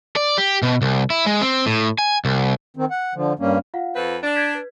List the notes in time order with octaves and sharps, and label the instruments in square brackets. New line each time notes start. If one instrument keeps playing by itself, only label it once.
[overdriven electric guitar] D5
G4
B2
C2
E4
G#3
C4
A2
G#5
C2
[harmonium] D#3 C4
F#5
D3 F3
G2 G3 A#3 C#4
[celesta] F4 F5 F#5
[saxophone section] F2 C4 B4
D4
[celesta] G6 G#6 B6
B4